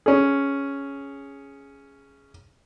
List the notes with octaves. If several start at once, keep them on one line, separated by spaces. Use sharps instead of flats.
C#4 G#4